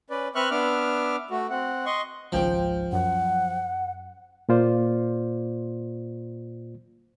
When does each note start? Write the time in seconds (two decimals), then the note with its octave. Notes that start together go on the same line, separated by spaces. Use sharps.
0.10 C#4 B4 D5
0.35 C4 B4 E5 C#6 F6 F#6
0.51 B3 D4 E5 D6 F6
1.31 A3 F#4
1.50 C4 F#5
1.86 D#5 C6 C#6
2.32 G#1 C#2 F3 G5
2.92 F#2 F#5
4.49 A#2 A#3 F4 C5 D5